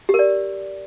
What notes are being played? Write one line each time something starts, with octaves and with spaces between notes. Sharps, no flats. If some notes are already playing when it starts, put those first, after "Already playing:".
G4
A#4
D5